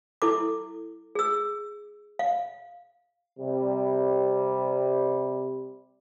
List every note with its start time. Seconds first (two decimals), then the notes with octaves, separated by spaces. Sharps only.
0.22 E4 A4 D6
1.15 G#4 E6
2.19 F5
3.39 C3 G3